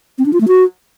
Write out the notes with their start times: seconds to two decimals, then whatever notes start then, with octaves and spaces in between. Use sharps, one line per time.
0.18 C4
0.26 D4
0.33 F4
0.41 A3
0.48 F#4